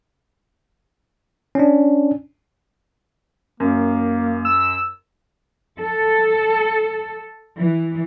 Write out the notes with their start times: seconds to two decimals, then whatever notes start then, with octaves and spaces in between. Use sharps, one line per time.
1.55 C#4 D4
3.60 F#2 A#3
4.45 E6
5.79 A4
7.57 E3